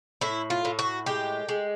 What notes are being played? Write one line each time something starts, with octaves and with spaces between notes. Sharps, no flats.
A2 E4
F4
A2
F#4
G#3 G4
G#3